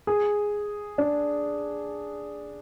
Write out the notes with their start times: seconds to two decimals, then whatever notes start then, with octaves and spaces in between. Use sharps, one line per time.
0.07 G#4
0.98 D4